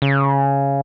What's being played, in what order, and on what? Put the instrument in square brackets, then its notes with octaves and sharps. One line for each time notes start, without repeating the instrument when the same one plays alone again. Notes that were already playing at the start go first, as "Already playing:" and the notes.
[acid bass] C#3